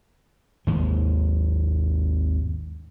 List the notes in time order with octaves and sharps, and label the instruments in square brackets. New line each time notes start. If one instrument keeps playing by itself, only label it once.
[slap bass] G#1 D#2 G#3